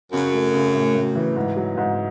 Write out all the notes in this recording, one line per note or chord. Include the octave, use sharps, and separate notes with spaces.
F#2 C#3
A3
C#3
A2
A2
E3
G#2
F#3
G#2